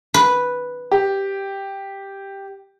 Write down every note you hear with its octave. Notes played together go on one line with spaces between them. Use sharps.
B4
G4